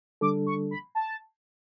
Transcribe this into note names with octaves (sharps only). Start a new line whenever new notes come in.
D3 G3 D4 A4 D6
C#6
B5
A5